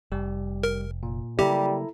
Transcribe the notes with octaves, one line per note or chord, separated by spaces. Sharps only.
F1 G3 G4
A#4
A#2
C#3 F#3 G3 A#3 E4 G4 A4 A#5